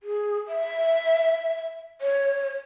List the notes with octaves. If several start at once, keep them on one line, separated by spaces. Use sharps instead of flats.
G#4
E5
C#5